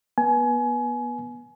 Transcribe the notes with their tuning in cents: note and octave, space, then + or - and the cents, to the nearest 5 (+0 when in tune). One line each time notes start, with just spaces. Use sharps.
B3 -25 G#5 +25